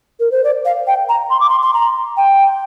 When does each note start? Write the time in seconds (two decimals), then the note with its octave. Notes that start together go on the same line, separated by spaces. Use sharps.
0.20 A#4
0.31 C5
0.44 D5
0.65 F5
0.87 G5
1.09 A#5
1.30 C6
1.40 D6
1.49 C6
1.62 C6
1.74 A#5
2.17 G5